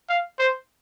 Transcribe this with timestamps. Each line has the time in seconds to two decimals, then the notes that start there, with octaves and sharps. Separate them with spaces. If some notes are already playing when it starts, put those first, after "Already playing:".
0.09 F5
0.39 C5